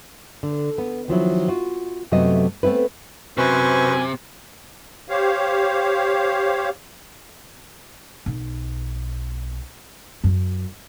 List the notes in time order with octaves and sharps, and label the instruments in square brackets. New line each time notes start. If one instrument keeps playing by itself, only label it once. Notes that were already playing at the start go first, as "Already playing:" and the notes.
[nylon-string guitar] D3
B3
D#3 F3 F#3 E4
F4 F#4
F#2 C3 F#3 A3 B3 D#5
A3 B3 C4 E4 B4
[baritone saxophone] F#2 [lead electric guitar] C3 [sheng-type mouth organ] B4 C5 C#6 [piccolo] G#5
[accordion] G4 C5 C#5 F5
[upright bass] B1
F#2